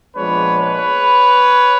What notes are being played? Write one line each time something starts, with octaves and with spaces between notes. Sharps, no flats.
A#2 F3 G#3 B3 D4 B4 C#5
B4 C#5